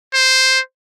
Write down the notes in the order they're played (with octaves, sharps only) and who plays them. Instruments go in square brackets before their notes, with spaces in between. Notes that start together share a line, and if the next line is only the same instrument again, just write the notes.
[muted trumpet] C5